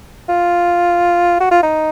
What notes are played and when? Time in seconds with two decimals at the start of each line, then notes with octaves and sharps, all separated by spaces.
0.29 F4
1.40 F#4
1.51 F4
1.63 D#4